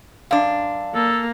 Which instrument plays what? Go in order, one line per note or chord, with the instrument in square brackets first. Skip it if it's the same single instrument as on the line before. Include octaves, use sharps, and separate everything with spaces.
[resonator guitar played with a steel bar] F#2 D4 [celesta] F5
[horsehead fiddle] A#3 [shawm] A4